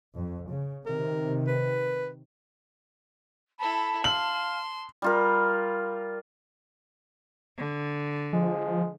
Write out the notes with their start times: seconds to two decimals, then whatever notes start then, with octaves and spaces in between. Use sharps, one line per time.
0.15 F2
0.50 C#3
0.86 C3 D#3 A#4
1.47 B4
3.60 E4 A4 A5 B5
4.04 F5 C6 F#7
5.02 G3 F4 A#4
7.57 D3
8.33 F3 G#3